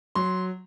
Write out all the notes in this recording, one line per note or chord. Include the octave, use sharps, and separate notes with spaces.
F#3 C6